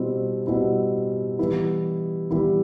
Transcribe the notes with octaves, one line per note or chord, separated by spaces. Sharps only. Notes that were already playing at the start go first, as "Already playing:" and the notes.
Already playing: B2 G3 C4 E4
B2 G3 C4 E4
E3 G3 B3 E4
E3 G3 B3 E4